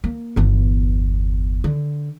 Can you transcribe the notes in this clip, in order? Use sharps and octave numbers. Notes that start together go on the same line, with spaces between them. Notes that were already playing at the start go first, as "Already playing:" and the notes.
A#3
G1 E2
D3